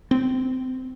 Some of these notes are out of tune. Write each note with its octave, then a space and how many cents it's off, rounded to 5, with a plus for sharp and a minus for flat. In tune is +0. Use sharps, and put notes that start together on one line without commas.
C4 -25